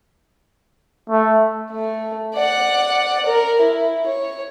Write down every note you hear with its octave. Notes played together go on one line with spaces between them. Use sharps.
A3
A3
D5 F#5
A#4
E4
C#5